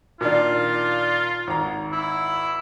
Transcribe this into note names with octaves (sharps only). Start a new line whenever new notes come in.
A#2 D#3 D4 F4
G#1 A#5
E4